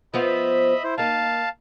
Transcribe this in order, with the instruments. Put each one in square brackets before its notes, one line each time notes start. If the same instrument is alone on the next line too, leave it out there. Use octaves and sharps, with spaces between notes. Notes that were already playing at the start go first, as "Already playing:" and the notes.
[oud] F3 B3 F4 [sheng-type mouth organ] D#5 E5 B5
[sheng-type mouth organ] E4 C5
[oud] A#3 D#4 [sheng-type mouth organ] F5 A5